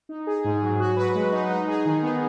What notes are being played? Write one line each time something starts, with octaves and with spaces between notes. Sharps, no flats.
D#4
G#4
G#2
F#3
F#4
B4
G#3
D#4
D#4
G#4
D#3
B3